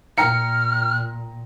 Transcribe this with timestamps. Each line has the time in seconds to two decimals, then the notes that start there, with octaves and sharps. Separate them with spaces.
0.18 A#2 G5 A#5 F6 C#7